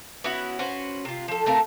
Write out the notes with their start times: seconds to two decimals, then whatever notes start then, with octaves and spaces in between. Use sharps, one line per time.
0.24 B3 C#4 E4 F#4
0.59 C#4 F#4 B4 C5
1.05 C3 F4
1.28 F3 A4
1.46 A3 C4 A#4 F5